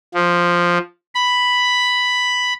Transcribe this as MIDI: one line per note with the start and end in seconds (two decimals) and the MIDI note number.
0.14 0.78 53
1.15 2.53 83